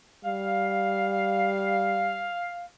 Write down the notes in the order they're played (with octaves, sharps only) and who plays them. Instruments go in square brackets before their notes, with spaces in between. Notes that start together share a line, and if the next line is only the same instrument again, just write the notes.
[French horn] G3 [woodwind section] F5